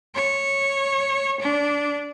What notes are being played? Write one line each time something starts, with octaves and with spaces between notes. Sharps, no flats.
C#5
D4